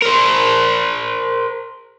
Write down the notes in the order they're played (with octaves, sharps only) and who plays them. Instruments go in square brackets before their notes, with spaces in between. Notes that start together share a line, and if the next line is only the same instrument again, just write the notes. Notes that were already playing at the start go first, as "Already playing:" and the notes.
[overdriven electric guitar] A#4 C5